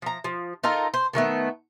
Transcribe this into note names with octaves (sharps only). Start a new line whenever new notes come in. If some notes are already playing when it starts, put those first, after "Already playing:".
F3 A#5
F3
D#4 F4 A4 A#4
C5
D3 D#3 A3 B3